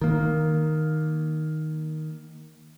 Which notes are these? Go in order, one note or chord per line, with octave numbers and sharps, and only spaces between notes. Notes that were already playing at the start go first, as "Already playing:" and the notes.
D#3 A#3